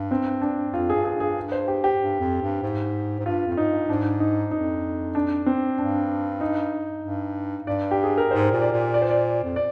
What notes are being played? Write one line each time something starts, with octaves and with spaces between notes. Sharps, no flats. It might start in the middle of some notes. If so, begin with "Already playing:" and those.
Already playing: G2
C4
D4
F2 F4
G2 G#4
G#4
G2 G#4
C5
G4
G4
G2
F2
G2
G#2
G#2
G2 F4
F2 F4
G#2 D#4
G2
G#2 D4
D#4
F2 D#4
D4
C4
G2 D4
D#4
G2
G2 D5
G4
G#4
A#4
G#2 C5
A#2
D5
A#2
D5
C5
D5
F2
D5